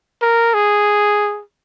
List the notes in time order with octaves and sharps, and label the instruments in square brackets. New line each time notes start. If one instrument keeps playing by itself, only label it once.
[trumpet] A#4
G#4